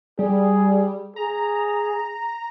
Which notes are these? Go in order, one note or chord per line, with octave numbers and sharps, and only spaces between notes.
G3 G#4
G#4 A#5